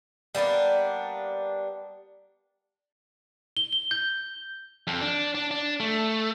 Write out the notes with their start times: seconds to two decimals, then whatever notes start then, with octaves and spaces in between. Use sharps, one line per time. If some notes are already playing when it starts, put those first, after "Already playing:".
0.35 G3 A#3 B3 D4
3.57 G7
3.73 G7
3.91 G6
4.87 F2
5.02 D4
5.35 D4
5.51 D4
5.80 A3